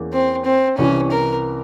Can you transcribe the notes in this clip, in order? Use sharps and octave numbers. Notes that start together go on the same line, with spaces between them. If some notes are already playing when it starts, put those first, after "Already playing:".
Already playing: E2 E3 A#3 C#4
C4
C4
C2 C3 E3 C#4
A#4